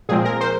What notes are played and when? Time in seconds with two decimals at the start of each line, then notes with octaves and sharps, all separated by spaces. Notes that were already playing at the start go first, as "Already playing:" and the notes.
0.09 A#2 F3 G#3 C4 G#4
0.25 A#4
0.41 C5